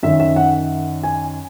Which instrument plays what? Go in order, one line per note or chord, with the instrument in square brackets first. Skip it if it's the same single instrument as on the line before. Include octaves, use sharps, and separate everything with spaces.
[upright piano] F#2 D#3 E5
E5
F#5
G#5